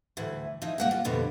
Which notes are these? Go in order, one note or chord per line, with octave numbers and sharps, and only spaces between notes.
D2 A2 E3
E3 F3 D#4
A#3 F#5 G5
F4
F2 B2 D3 G3